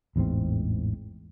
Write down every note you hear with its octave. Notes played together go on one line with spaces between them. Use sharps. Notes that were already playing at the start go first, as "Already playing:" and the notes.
A1 E2 G#2 C4